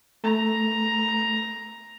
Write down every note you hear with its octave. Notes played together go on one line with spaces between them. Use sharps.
A3 A#5